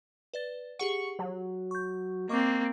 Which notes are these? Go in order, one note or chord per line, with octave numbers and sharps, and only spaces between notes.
B4 D5 A6
G4 G#4 F#5 C#6
F#3
C#6 G6
A#3 C4 D#5 C#6 D6